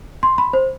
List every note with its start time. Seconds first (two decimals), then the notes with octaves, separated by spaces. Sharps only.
0.23 C6
0.38 B5
0.53 C5